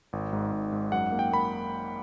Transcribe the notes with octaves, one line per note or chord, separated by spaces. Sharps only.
G#1
G#2
G#2
G#2
F#2 F#5
A#3
G5
A#3 B5